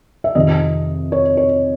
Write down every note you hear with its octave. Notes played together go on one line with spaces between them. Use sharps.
E5
F2 C3 D#3 D#5
C#5
C#5